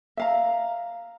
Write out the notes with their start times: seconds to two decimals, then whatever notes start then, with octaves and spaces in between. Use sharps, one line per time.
0.17 E5 F5 A#5